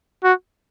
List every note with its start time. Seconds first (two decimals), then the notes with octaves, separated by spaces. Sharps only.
0.24 F#4